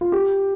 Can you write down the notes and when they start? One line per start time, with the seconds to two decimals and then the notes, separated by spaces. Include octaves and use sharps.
0.01 F4
0.12 G4